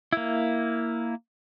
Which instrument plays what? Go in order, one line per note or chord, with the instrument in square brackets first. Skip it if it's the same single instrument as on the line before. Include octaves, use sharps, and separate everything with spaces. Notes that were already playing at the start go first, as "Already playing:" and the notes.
[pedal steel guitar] A#3 E4